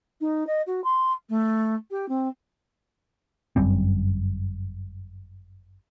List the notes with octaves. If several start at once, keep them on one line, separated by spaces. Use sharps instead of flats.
D#4
D#5
F#4
C6
A3
G4
C4
G1 F#2 G3 C4